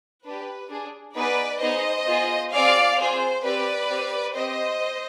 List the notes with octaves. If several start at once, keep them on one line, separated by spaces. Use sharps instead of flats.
D4 G4 B4
D4 G#4
B3 D#4 G#4 B4 D5
B3 D#4 G#4 C5 D#5
B3 F4 G#4
C4 F4 G#4 D5 F5
C4 F4 G#4 C5
C4 G4 B4 D5
C4 G4
C4 G4 C5 D#5